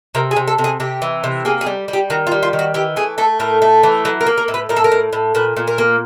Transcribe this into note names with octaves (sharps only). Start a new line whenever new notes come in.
C3 A#4
G#4
C3
A4
C3
G#4
C3 G4
E3
C3
A#3 G#4
G#4
G3
G3
G4
D#3 F#4
F4
G3
F4
D#3
F#4
E3 G4
A3 G#4
A3 A4
A2 A#4
A3
E3
F#3 B4
A#4
A#3
A#4
A2
B4
A2 A#4
A4
A#4
A2
A2
A#2 B4
A#2
A#4
A#3